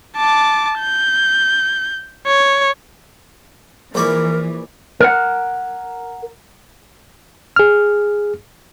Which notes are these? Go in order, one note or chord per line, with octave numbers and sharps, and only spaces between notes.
A5 D6
G6
C#5
A#1 E3 A#4 D5 C#6
A#4 F#5
G#4 F6